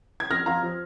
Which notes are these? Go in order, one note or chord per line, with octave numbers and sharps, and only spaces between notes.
G#6
F2 F6 A#6
F2 F5 A#5
F3